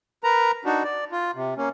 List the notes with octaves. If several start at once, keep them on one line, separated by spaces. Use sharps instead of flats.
A#4 B4 A#5
D4 D#4 F#4
D5
F4
C3
A#3 C#4